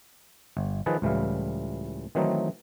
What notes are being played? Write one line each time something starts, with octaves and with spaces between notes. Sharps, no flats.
G1
D#3 F3 G#4 B4 G#5 A5
C#2 A2 E3 G3 F5
D#3 E3 F#3 A3 C4 D#4